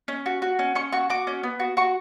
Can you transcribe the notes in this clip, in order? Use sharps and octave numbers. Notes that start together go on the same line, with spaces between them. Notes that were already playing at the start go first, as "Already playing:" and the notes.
C#4
F#4
F#4
C#4
C#4 C#6
F#4 C#6
F#4 D6
C#4
B3
F#4
F#4 C#6